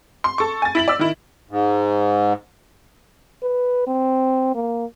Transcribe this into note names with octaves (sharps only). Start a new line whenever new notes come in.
C6
A4 C#6
G#5 A6
E4 B6 F#7
D5 E6
D#3 E4
G#2
B4
C4
A#3